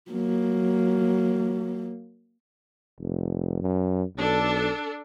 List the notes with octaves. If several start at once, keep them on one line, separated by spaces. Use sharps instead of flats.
F#3 A#3
F1
F#2
B1 D4 A4